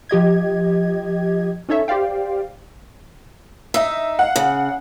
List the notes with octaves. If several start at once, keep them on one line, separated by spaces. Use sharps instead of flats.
F3 G4 D#5 G#6
C#4 D#4 A4 C#5 E5
G4 C5 D5 F5 G5
D#4 E5
F5 F#5
C#3